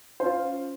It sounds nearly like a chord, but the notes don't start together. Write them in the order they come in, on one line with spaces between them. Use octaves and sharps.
C5 C#4 F4